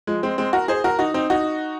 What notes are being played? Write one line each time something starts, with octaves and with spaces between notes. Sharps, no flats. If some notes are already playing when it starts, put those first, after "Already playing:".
F3 G#3
G#3 C4
G#3 C4
F#4 A#4
G#4 C5
F#4 A#4
D#4 F#4
C4 D#4
D#4 F#4